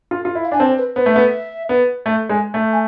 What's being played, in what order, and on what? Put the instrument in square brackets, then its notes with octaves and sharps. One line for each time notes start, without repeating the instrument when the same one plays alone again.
[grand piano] F4
F4
E4
[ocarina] F5
[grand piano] D4 [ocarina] G#5
[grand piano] C4 [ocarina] A5
[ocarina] B4
[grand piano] B3 [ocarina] C5
[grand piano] A3
[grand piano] B3 [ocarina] E5
[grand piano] B3
A3
G#3
A3
[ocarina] G#5